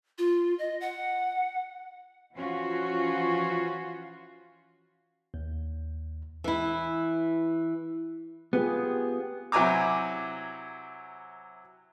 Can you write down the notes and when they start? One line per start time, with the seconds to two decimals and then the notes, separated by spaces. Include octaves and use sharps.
0.18 F4
0.59 D#5
0.81 F#5
2.34 E3 F3 C#4 F4 F#4
5.34 D#2
6.44 E3 E4
8.53 B3 F4 G4 G#4
9.52 C3 F#3 E4 G#5 A#5 D6